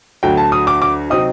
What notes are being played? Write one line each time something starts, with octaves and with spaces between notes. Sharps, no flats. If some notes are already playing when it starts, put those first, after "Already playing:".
D2 D3 F#3 G5
A5
D#6
D6
D6
C3 F#3 C4 D#4 D#6